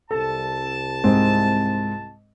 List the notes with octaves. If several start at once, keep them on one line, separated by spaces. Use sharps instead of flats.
C2 A4 A5
G#2 G#3 C4